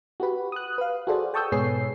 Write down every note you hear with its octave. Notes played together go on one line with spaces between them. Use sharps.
F#4 G4 B4
D#6 F#6
B4 F5
F#4 G#4 A4 C5 D5
G5 A5 C#6 D#6 E6 G6
G#2 B2 G#4 B4 C#5 C7